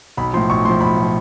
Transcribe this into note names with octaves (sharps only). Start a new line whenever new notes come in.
B1 B5
A2 F3 C6
B1 C#6
A2 F3 C6
B1 B5
A2 F3